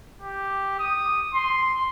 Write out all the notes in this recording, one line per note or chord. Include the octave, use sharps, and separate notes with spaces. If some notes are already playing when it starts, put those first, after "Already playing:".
G4
D#6
C6